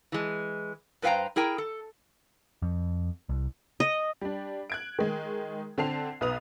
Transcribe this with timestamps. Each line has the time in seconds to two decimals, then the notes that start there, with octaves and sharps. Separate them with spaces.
0.12 E3 G#3
1.02 G2 B4 C5 F5 G5 A#5
1.36 E4 G#4 A#4 G5 A#5
1.58 A4
2.62 F2
3.29 C2
3.80 D#5
4.21 G3 D4
4.70 F#6 G#6 D7
4.99 D#3 G#3
5.78 D3 C4 A5 C7 F7
6.21 B1 B4 D#6 F7